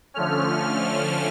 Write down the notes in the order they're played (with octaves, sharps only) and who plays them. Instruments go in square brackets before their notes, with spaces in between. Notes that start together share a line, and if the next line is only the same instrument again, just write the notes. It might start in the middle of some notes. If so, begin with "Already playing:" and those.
[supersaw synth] D3 F3 A3 C#4 F6